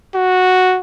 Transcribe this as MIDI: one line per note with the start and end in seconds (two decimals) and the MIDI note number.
0.14 0.80 66